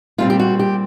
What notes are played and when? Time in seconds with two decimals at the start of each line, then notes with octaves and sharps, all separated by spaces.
0.18 A#2 G3 C4 F4
0.30 G4
0.39 F#4
0.59 G4